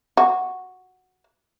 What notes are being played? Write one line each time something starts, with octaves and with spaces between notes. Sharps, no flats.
F#4